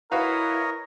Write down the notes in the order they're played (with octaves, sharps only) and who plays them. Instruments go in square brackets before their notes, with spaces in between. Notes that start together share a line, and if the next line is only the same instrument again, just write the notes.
[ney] E4 [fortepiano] F#4 B4 F5 [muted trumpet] A#4 [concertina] C#5 D#5